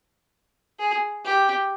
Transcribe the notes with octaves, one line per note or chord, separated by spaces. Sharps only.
G#4
G4